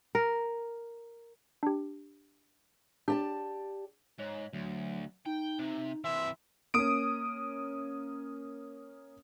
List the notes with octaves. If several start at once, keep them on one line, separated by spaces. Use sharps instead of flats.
A#4
D4 G4
D4 G4 D5 A5
G#2 C#5
D2 F#3
D#4 G5
C3
C3 E3 E5 C6
A#3 C#4 D#6 D7